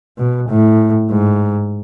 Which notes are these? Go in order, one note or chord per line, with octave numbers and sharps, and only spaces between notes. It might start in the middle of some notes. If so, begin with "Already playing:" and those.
B2
A2
G#2